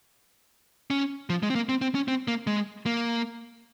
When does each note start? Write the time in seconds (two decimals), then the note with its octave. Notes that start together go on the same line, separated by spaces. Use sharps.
0.90 C#4
1.30 F3
1.43 G#3
1.50 C4
1.55 A#3
1.69 C4
1.82 C4
1.95 C#4
2.08 C4
2.28 A#3
2.47 G#3
2.86 A#3